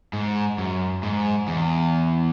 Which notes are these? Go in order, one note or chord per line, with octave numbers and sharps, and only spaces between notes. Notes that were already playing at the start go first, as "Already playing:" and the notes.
G#2
F#2
G#2
E2